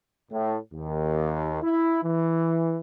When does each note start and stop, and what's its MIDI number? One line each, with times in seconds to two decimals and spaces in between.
0.32 0.57 45
0.74 1.62 39
1.63 2.00 64
2.03 2.79 52